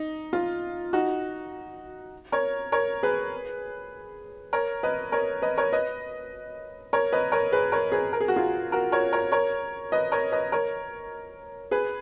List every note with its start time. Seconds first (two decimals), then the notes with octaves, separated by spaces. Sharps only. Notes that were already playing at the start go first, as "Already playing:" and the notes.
Already playing: D#4
0.33 F4
0.93 D#4 F#4
2.32 A#4 C#5
2.72 A#4 C#5
3.03 G#4 B4
4.53 A#4 C#5
4.83 B4 D#5
5.12 A#4 C#5
5.42 B4 D#5
5.58 A#4 C#5
5.72 B4 D#5
6.93 A#4 C#5
7.12 B4 D#5
7.32 A#4 C#5
7.52 G#4 B4
7.72 A#4 C#5
7.92 G#4 B4
8.13 A#4
8.21 G#4
8.28 F#4
8.36 F4 G#4
8.72 F#4 A#4
8.92 A#4 C#5
9.13 A#4 C#5
9.32 A#4 C#5
9.92 B4 D#5
10.12 A#4 C#5
10.32 B4 D#5
10.52 A#4 C#5
11.71 G#4 B4